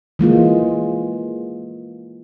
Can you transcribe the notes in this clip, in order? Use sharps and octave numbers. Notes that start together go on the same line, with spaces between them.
E3 G#3 A#3 F4